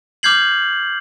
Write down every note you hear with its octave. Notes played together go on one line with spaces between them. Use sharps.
D6 F6 G6 G#6 C7 F#7